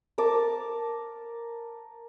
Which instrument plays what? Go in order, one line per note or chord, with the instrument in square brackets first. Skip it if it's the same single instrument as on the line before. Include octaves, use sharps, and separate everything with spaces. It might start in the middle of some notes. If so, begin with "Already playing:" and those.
[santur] A#4 A5 D6